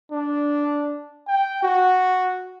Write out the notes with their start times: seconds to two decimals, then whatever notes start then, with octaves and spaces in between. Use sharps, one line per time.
0.11 D4
1.27 G5
1.63 F#4